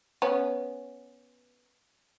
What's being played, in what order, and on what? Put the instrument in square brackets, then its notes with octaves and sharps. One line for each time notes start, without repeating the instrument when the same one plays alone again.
[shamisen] B3 C#4